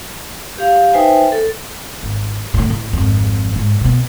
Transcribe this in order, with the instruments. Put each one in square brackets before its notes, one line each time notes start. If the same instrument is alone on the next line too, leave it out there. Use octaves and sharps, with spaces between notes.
[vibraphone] G4 F5
D#4 B4 C5 E5 G5 G#5
A4
[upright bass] G#1
A2 D3
A2
G#1 F2
G#2
B2 B3